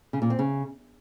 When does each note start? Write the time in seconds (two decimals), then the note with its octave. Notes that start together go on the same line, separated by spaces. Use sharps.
0.13 C#3
0.22 A#2
0.30 C4
0.39 C#3